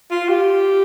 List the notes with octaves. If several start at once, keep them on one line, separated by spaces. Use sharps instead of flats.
F4
G4